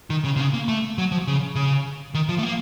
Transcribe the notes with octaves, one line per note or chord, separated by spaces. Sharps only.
D#3
C#3
C3
C#3
A#3
A3
F#3
F3
C#3
C#3
D#3
F3
A3
A#3